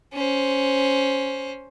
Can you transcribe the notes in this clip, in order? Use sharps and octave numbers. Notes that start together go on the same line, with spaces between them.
C#4 C5